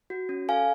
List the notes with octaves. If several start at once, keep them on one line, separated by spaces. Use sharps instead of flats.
F#4
C#4
A4 F5 G#5